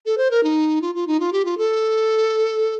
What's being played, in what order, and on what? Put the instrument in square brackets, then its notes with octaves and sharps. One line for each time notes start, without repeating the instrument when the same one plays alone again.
[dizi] A4
C5
A#4
D#4
F4
F4
D#4
F4
G4
F4
A4